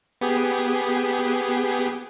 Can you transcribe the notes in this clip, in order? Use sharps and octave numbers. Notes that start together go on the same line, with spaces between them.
B3 G4 G#4